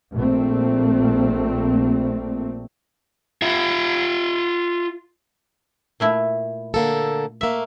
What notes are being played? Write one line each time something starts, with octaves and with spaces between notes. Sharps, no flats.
A#1 A3 C4
F4 E5
A#2 A3 E4
D3 A#3 A4
A3 A#3 E5